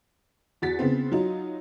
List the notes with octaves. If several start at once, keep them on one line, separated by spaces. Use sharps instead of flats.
E2 F#4 A6 B6
C#3 B3 C4
F#3 D#4 F4